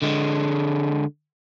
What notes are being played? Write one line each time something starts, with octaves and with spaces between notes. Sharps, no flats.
D3 G#3